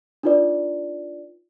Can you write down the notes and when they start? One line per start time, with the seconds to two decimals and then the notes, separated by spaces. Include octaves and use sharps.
0.23 D4 D#4 F4 B4 D5